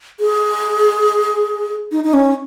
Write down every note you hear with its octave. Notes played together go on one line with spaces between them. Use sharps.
G#4
D#4
D#4
C#4